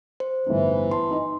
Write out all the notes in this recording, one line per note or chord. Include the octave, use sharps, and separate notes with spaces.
C5
G1 A2 E3 D#4
A5 C6
D#4 D#5